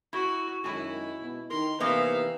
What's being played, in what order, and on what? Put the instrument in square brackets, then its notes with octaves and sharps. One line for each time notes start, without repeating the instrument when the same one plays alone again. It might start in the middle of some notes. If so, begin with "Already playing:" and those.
[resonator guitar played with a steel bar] E4 [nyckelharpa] F#4
[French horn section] F#2 D#3 G#3 [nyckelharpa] E4 [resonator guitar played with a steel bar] F#4 G#5
[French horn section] B2
[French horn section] D#3 [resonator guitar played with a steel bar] A#4 [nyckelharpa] C6
[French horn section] C3 A#3 B4 [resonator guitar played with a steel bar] E3 B3 D#4 [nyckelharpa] E5 F5